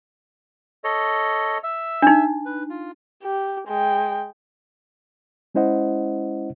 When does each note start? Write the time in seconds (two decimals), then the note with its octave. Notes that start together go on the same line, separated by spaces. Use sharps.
0.84 A4 C#5 D#5
1.64 E5 E6
2.02 D4 D#4
2.46 B4
2.70 F4
3.23 G4
3.67 G#3 G5
5.55 G#3 C#4 E4 C5 D#5 F#5